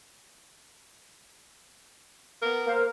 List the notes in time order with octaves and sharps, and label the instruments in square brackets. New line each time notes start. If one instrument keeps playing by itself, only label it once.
[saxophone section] B3 A#4
[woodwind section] A#3 C5 F5